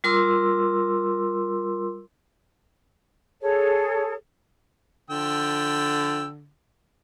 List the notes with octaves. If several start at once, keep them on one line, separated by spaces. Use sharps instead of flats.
G3 F4 A#4 C6 D6 E6
G#4 A4 C#5
D3 F3 G5 E6